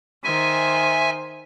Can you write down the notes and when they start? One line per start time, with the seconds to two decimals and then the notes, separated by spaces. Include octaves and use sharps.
0.24 D#3 C5 E5 G#5